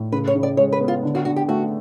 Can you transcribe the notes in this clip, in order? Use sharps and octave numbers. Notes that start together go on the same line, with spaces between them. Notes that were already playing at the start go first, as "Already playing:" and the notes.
Already playing: A2
C#3 B4
C#5
C#3
D5
G#3 C#5
B4
B3
F4
D3
F#4
D3 F#4
G4
A3 F#4